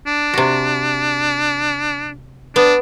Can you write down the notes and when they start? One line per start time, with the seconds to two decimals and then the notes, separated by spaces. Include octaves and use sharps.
0.06 D4
0.34 C3 F#4
2.56 B3 D4